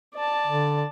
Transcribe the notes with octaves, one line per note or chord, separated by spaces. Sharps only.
D5 A5
D3